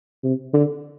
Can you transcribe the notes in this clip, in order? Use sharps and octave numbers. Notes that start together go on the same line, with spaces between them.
C3
D3